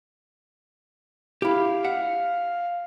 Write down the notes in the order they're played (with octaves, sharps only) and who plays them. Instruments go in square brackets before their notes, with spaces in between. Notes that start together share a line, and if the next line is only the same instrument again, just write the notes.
[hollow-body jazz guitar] E4 G4 [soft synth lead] F5
[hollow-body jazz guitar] E5 F#5